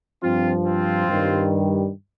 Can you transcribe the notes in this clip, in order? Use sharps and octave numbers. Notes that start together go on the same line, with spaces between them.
G2 F3 C4 F4
C4 F4
G2 D#3 G3